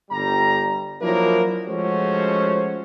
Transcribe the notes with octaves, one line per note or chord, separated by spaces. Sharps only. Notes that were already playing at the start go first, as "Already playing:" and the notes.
G1 G3 A#5
F3 F#3 A#3 D4 E4 A#4
F3 G#3 A3 C#4 F#4 C5